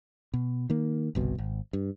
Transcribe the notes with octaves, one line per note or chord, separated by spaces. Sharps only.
B2
D#3 A#3
G1 C2 B2
G#1
G2